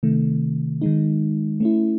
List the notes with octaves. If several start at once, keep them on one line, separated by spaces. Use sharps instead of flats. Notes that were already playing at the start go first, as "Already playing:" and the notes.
C3 D#3 A3
D#3 G#3 D#4
A3 C#4 E4